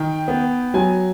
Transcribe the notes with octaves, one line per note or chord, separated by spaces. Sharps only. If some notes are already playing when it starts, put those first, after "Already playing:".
Already playing: D#3 G5
B3
F#3 G#5